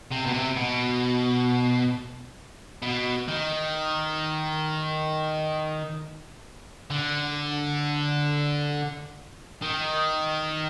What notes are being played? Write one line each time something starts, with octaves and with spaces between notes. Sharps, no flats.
C3
B2
C3
B2
B2
D#3
D3
D#3